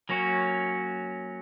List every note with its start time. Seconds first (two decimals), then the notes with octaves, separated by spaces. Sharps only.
0.09 F#3 A#3 C#4 F#4